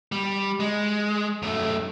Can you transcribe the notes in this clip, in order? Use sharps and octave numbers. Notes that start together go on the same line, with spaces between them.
G3
G#3
F#2 A3